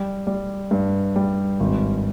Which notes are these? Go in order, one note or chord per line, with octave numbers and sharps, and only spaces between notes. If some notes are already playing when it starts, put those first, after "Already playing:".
Already playing: G3
G3
G2
G3
G#1